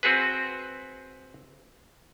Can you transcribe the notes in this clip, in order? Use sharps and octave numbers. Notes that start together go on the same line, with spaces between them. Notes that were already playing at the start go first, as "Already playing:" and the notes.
C4 F#4 G#4 B4